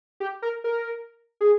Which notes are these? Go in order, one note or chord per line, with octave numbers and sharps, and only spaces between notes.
G4
A#4
A#4
G#4